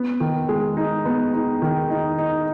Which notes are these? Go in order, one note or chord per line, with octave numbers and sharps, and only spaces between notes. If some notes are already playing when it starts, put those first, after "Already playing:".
Already playing: B3
D#3
G#3
D#4
B3
D#4
D#3
D#4
D#4